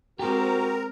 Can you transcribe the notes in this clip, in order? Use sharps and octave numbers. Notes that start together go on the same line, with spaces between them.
G#3 C4 F#4 G4 A4 A#4 C5 A#5